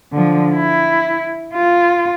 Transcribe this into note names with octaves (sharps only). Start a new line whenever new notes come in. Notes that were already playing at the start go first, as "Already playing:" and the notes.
D3 F3
E4
F4